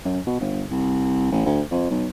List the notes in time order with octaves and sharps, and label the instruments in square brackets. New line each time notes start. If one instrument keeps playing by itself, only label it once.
[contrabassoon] F#2
B2
G1
C2
A1
D2
F2
B1